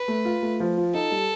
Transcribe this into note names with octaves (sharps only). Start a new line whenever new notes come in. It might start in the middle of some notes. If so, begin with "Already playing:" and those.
Already playing: B4
A3
F4
A3
F3
F4
D#4 A4
G3